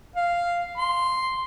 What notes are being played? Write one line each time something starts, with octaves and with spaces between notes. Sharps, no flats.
F5
C6